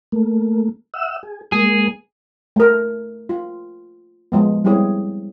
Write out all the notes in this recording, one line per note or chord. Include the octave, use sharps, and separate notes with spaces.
A3 A#3
E5 F#5 E6
G#4
G#3 A#3 G#4
A3 A#4
F4
F3 G#3 B3
G3 B3 C4 E4 G#4 C#5